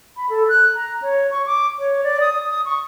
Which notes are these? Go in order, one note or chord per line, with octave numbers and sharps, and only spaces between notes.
B5
A4
F#6
A#5
C#5
C#6
D6
C#5
D5
D#6
D#6
C#6